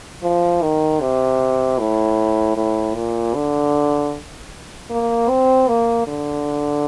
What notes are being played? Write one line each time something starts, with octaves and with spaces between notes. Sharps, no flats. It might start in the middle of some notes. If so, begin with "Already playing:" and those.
F3
D#3
C3
A2
A2
A#2
D3
A#3
C4
A#3
D3